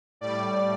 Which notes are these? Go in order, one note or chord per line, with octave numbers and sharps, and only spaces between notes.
A2 G3 D5